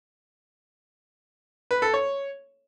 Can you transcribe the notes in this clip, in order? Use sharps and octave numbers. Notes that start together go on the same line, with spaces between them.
B4
A4
C#5